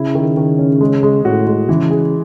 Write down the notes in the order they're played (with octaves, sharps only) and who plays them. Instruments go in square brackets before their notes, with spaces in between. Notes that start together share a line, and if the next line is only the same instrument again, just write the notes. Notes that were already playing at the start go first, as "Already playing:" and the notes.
Already playing: [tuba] C#3 [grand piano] E4
[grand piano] D#3
D#3
C#4
G#3
G#3
[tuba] A2 [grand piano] F#4
[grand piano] G#3
[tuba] C#3 [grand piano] E3
[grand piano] G#4